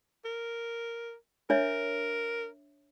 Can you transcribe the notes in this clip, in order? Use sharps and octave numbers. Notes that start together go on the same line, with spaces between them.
A#4
D4 A#4 C#5 E5